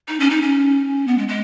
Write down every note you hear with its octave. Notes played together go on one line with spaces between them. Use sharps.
D#4
C#4
D#4
C#4
B3
G#3
G#3